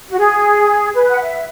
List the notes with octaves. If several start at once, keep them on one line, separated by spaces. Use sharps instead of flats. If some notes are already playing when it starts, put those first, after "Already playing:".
F#4
G#4
B4
F#5
E5